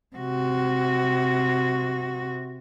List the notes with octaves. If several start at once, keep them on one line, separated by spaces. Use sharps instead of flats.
C3 F#4